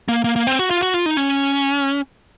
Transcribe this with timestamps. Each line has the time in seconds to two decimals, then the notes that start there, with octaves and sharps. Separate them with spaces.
0.09 A#3
0.24 A#3
0.36 A#3
0.47 C4
0.59 F#4
0.71 F4
0.82 F#4
0.94 F4
1.06 D#4
1.17 C#4